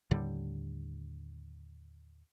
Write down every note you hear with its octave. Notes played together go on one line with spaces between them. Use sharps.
D#2 A2 D3 G3